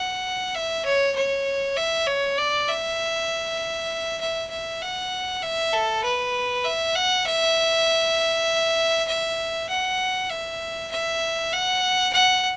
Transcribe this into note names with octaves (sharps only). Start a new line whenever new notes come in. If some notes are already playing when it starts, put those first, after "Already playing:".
Already playing: F#5
E5
C#5
C#5
E5
C#5
D5
E5
E5
E5
F#5
E5
A4
B4
E5
F#5
E5
E5
F#5
E5
E5
F#5
F#5